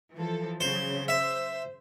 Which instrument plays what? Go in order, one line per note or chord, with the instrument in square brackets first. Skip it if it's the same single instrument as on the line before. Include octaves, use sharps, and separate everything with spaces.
[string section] E3 F3 A4
[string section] C#3 F#3 [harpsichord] C5
[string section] C5 [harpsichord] E5